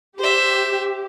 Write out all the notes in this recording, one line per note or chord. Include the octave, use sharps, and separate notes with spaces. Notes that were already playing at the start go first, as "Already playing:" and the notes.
G4 C5 E5